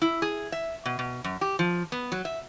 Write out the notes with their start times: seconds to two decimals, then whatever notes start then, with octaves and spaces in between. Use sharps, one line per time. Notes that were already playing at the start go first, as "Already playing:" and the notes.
0.02 E4
0.22 G#4
0.52 E5
0.86 B2
0.99 B2
1.24 F#2
1.41 G4
1.59 F3
1.92 B3
2.12 F#3
2.25 E5